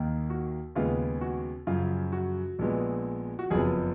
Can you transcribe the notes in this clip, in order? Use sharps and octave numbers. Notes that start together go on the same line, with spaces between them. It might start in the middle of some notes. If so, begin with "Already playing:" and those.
Already playing: D#2 D#3 A#3
F#4
D#2 C#3 G#3 B3 F4
F#4
F#2 C#3 F3 F4
F#4
A#1 A#2 G#3 B3
F#4
F#1 F2 F3 B3 G#4